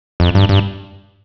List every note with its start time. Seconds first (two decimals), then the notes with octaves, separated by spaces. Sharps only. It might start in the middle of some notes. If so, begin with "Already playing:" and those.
0.20 F2
0.35 G2
0.49 G2